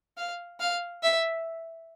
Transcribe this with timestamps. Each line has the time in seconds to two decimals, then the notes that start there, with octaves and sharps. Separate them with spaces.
0.17 F5
0.60 F5
1.03 E5